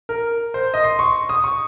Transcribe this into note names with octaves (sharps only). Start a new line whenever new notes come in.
A#4
C5
D#5
C6
C#6
D#6
C#6